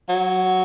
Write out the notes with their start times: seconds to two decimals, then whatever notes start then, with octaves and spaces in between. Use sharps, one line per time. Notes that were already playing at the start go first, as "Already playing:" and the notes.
0.09 F#3